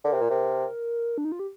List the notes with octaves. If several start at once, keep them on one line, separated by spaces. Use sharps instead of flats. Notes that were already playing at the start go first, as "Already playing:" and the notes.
D3 A#4
C3
A#2
C3
D4
D#4
F4
G4